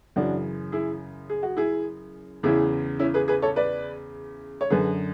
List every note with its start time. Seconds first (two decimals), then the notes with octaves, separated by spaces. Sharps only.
0.16 F#2 C#3 E3 D4 F#4
0.72 E4 G#4
1.30 G#4
1.43 F#4
1.57 E4 G#4
2.43 E2 C#3 E3 E4 G#4
2.99 C#4 E4
3.14 G#4 B4
3.28 G#4 B4
3.42 A4 C#5
3.56 B4 D5
4.61 C#5
4.70 F#2 D3 G#4 B4